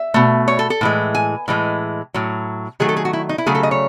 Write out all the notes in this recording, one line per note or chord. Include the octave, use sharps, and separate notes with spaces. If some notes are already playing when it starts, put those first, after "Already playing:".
Already playing: E5
B2 A3
C#5
A4
A4
A2 E3 G#3
G#5
A2 E3 G#3
A2 F#3
D#3 F#3 A3 G#4
A4
G#4
F#4
E4
D#4
E4
C#3 F#3 A3 G#4
A4
D#5
C#5